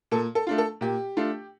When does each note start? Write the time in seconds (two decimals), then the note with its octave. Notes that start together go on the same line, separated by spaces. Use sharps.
0.11 A#2 A4
0.35 A4
0.47 A3 D4 F4
0.58 A4
0.81 A#2 G4
1.17 A3 D4 F4